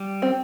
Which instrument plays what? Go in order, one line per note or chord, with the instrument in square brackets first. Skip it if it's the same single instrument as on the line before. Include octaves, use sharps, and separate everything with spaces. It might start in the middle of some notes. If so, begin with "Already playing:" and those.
Already playing: [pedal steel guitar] G3
[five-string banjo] C4